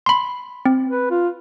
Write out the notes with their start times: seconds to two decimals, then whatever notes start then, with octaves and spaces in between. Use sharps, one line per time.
0.06 B5 C6
0.65 C4
0.88 B4
1.11 F4